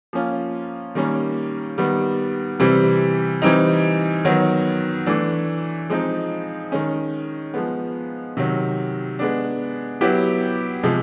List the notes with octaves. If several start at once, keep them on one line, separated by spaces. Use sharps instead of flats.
F3 A#3 C#4 F4
D#3 G3 A#3 C#4
D#3 G3 B3
C3 E3 G3 C4
E3 G3 C4 D#4
D#3 F#3 B3
E3 A3 D4
F3 G#3 C4 D#4
D#3 G#3 C#4
F3 G#3 B3
C3 D#3 F#3
G#3 B3 D4
F#3 B3 E4 G4
C3 F3 G#3